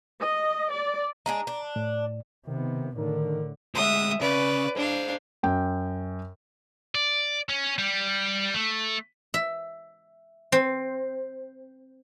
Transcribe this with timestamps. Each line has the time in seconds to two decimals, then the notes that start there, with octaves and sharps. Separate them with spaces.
0.21 D#5
0.72 D5
1.26 G#3 D4 G#4 A#5
1.47 D4
1.76 A2
2.47 C3 D#3 B3
2.98 A2 D3 D#3 A#4
3.75 D2 G#3 E5 D#6
4.21 C#3 B4 D5
4.77 D4 C5 D#5 F5
5.43 F#2 G5
6.95 D5
7.49 C#4
7.78 G3
8.54 A3
9.34 E5
10.52 C4